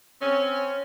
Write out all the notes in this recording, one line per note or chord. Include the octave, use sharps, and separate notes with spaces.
C4 C#4 C#5